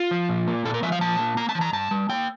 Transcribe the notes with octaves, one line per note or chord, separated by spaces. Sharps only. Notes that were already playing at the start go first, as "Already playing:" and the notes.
Already playing: F4
F3
A#2
A#3
A#2 A4
A#4
F3 E5
F5
A#2 A5
A#3
A#3 A#5
A5
E3
A#5
G2 A5
G3
A#3 G5